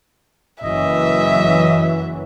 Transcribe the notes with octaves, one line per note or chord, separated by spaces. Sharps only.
F#1 E3 F#3 D#5 E5